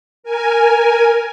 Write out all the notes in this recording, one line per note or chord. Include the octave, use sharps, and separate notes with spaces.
A#4 G#5